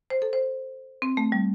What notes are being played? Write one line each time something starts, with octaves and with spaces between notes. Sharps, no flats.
C5
A4
C5
C4
A3
G3